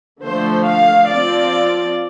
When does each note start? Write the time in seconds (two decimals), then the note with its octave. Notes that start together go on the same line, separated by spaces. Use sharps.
0.23 D3 F3 A3 C5
0.67 F5
1.10 F3 C4 F4 D5